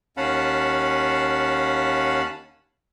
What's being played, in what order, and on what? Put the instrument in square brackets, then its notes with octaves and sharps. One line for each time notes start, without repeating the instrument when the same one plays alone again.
[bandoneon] D#2 C#4 F5 F#5 A5 B5